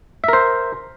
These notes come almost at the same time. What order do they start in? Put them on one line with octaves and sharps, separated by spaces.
E5 A#4 C5